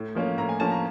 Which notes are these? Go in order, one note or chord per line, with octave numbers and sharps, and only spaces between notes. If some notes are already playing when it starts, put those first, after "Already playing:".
Already playing: A2
F3 A#3 C#4
A2 A#5
G#5
F3 A#3 C#4 A5
A#5